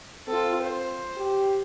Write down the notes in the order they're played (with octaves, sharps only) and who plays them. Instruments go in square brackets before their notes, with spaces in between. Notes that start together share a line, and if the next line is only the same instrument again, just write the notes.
[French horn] C4 [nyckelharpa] F4 A4
[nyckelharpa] C5
[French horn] G4